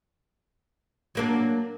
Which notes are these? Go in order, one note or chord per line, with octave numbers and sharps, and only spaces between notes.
F#3 A#3 D4